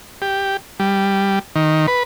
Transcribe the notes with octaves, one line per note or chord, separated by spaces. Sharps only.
G4
G3
D#3
B4